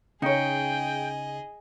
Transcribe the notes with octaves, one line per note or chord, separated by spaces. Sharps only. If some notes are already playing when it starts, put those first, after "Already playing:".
C#3 D#4 G#4 C#5 D#5 G5